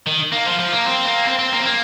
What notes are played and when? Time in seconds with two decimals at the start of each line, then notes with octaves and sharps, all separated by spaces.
0.06 D#3
0.32 A#3
0.46 F3
0.60 F3
0.73 A#3
0.86 C4
1.05 A#3
1.25 C4
1.39 C4
1.52 A#3
1.60 C4
1.66 A#3